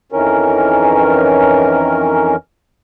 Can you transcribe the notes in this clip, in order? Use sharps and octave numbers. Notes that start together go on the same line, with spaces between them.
F2 D#3 E3 C#4 A#4